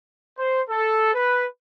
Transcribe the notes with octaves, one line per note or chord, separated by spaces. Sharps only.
C5
A4
B4